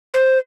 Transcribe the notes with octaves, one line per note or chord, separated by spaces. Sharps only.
C5